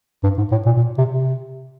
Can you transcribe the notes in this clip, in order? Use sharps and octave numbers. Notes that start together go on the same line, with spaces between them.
G2
G#2
A2
A#2
A#2
C3
C3